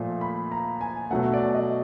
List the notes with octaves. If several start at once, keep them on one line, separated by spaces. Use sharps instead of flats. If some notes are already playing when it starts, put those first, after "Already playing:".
Already playing: A#2 F3 A3
B5
A#5
G#5
B2 F#3 A3 F#5
D5
D#5